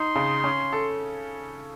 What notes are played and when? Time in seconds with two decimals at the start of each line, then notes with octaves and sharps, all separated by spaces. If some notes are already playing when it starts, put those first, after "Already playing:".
Already playing: D#4 C6
0.15 C#3
0.44 C#4
0.73 A4